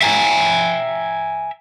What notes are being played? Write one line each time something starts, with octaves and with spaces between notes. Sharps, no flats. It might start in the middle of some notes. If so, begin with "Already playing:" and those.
E5 G5 G#5 A#5